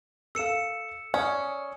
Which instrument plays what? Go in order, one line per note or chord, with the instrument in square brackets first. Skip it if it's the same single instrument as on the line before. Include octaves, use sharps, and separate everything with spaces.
[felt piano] A4 F5 [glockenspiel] E6 C#7 E7
[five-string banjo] C#4 [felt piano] D5 C#6 D#6